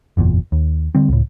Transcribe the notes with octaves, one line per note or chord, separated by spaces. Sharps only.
F#1 E2 G2 A#2
D#2
D3 G3 C4
C#2 A2